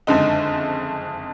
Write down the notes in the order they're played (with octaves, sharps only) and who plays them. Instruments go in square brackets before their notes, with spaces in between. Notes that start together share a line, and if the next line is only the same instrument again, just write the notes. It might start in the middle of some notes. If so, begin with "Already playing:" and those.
[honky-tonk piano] F#1 F2 D3 G#3 D#4